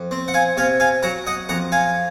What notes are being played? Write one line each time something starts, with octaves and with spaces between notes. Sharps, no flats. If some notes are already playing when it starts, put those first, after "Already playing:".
Already playing: F2
C4
F#5
F5 G#5
C3 F5 G#5
F5 G#5
F#3 F#5 A#5
D#5 F#5
F2 F#5 A#5
F5 G#5